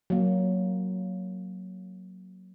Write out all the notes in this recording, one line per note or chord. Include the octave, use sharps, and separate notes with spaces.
F#3 A#3